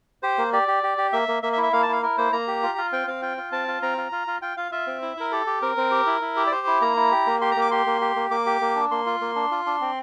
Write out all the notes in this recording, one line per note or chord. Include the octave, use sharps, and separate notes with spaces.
G4 C5
A#3
G4 D5
G4
G4
G4
A#3 E5
A#3
A#3 E5
E5
E4
E5
A#3 F5
A5
E4 F5
E4 A#4
A#3 C5
A#3 A#5
G4
F4
F4
C4 G5
C4 F5
F4 G5
F4
C4 A5
F4
C4 A#5
F4
F4
F4
F4 G5
F4 F5
F4 E5
C4
E4
E4 A#4
G4 A4
G4
C4 A#4
C4
G4
E4
E4
G4
D5
G4 C5
E4
A#3 A#5
E4
G4
A#3
G4 C6
A#5
A#3 D6
G4 C6
A#3
G4
A#3
A#3 D6
G4
A#3
D4
A#3 C6
F4
A#3
D4
F4
D4
C4